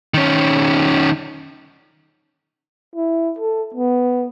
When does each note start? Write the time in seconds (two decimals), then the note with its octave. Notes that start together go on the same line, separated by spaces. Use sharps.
0.14 D#3 C#4
2.95 E4
3.39 A4
3.74 B3